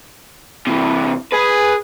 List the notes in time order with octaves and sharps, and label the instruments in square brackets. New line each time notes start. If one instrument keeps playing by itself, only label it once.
[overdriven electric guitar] C3 E3
[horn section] G#4 [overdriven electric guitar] B4